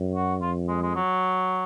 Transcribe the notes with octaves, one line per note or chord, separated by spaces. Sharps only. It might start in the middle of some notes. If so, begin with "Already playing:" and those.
Already playing: F#2
F#4
F2 F4
G#3
G#3
F#3